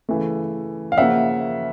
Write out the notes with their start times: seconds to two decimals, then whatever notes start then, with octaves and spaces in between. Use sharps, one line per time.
0.09 C#3 E3 A3
0.92 F5
0.97 C#3 F3 A#3 E5 F#5